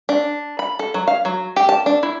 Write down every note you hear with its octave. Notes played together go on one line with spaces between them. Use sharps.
D4
B5
A4
F#3
F5
F#3
G4
A5
D4
E4